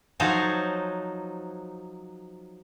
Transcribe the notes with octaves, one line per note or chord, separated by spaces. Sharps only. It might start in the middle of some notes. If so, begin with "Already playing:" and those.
F3 F#3 D#4 A4 C5 C#5